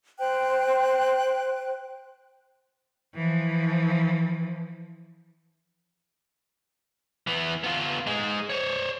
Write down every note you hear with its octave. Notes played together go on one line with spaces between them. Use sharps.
C5 G5 F#6
E3 F3
E3 B3
B3 F4
G#3 D#4
C5 C#5